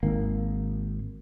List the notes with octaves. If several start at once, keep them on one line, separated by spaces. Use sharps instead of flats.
G#1 A#3